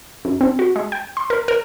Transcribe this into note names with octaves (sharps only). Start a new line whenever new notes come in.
F#2
C4
F#4
G#3
G5
C6
A#4
A#4